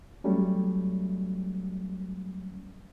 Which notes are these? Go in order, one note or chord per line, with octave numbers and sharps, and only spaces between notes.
F#3 G3 A3 C#4